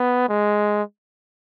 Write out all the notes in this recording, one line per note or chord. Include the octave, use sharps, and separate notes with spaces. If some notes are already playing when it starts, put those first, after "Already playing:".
Already playing: B3
G#3